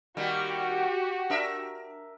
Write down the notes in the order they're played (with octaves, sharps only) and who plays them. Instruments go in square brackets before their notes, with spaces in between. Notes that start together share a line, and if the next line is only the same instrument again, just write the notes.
[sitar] D#3 G3 A#3 [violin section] F#4 G4
[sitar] D4 A#4 E5